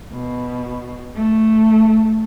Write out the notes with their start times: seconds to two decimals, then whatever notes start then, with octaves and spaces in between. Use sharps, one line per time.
0.13 B2
1.16 A3